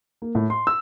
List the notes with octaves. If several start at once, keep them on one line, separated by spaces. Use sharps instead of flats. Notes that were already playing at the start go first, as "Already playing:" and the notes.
A#3
A2
C6
E6